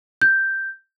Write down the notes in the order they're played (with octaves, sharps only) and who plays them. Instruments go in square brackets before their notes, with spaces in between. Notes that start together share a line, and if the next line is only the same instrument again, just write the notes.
[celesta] G6